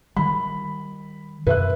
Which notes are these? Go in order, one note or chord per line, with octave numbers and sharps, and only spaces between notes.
D#3 G3 B5
F#2 B2 D#3 B4 E5 F#6